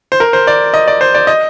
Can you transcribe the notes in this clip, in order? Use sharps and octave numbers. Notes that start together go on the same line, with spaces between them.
C5
A#4
C5
D5
D#5
D5
C5
D5
D#5